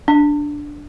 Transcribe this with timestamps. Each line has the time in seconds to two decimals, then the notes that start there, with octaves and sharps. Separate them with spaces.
0.08 D4